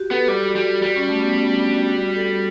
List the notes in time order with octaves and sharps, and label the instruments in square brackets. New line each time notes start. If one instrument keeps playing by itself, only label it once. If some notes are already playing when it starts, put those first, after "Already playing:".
Already playing: [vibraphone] F#4 G4
[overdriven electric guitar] B3 [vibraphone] A4
[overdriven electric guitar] G3 [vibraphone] G4
[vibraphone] F#4
G4
[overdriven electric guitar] G3 [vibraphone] F#4
[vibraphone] G4
[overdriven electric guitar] G3 [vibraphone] F#4
[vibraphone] C#4
A3
B3
C#4
D4
F#4
F#4
A4